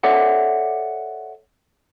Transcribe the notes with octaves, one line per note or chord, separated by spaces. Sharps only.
A4 C#5 D5 E5 F#5